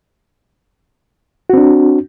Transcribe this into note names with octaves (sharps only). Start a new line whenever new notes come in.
C4 D4 F#4